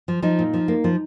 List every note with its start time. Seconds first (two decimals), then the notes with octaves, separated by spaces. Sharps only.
0.08 F3
0.22 F3 D#4
0.39 A#2
0.54 F3
0.68 A#3
0.84 F3